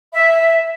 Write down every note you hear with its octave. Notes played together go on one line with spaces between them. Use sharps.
E5